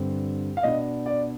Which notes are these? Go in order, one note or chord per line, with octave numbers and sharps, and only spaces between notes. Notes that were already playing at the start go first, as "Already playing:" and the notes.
Already playing: G2 D3 G3 C4
F5
B2 B3 D4 D#5
D5